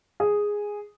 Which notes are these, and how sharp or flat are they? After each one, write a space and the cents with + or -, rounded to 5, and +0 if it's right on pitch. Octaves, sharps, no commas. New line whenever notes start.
G#4 -5